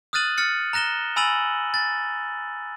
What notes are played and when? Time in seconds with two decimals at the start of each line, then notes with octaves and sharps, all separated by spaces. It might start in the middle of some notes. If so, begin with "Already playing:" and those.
0.13 D#6 F6 F#6 A6 D#7 F#7
0.38 F6 A6 C#7
0.73 A#5 F#6 A#6 E7 G7
1.16 G#5 B5 E6 A6 D#7 F#7
1.74 A6